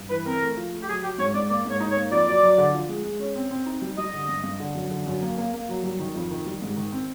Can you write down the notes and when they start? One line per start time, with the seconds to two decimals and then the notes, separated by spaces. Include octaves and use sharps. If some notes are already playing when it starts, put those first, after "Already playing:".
Already playing: G2
0.10 E3 B4
0.25 C4 A#4
0.41 A3
0.57 F3
0.72 A3
0.83 G4
0.88 F#3 G#4
1.03 F#3 G4
1.18 G#2 C#5
1.34 G#2 D5
1.49 A#3 D5
1.65 G#2 C#5
1.80 D#4
1.91 C#5
1.96 A#3
2.11 F2 D5
2.27 F#3
2.43 F#3
2.58 D3
2.73 F3
2.89 G#3
3.04 G#3
3.20 C#4
3.36 C4
3.51 C4
3.66 D#4
3.82 G3
3.98 G3 D#5
4.13 D3
4.29 G2
4.44 G2
4.60 D3
4.75 F#2
4.90 D3
5.07 F#2
5.22 A#3
5.38 A#3
5.53 A#3
5.69 F#3
5.83 G3
5.99 D#3
6.15 F2
6.31 D#3
6.46 G3
6.62 G#2
6.76 D#3
6.92 C4